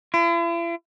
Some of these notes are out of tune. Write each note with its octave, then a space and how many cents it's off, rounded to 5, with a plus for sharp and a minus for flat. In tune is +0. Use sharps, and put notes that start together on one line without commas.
E4 +45